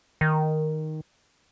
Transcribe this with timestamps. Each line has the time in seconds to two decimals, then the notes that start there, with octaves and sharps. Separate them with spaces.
0.21 D#3